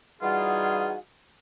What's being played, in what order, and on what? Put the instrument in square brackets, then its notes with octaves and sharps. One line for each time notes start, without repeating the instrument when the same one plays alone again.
[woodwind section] E3 G3 F4 [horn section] D#4 F#4 G#4 [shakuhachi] F#5